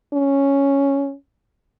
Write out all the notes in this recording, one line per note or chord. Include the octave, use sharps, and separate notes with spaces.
C#4